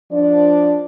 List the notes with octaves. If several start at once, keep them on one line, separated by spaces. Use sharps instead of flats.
F3 D4 D5